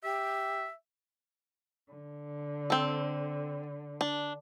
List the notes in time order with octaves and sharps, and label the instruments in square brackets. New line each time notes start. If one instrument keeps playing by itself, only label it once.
[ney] G4 [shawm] E5
[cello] D3
[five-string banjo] C4 A4
D4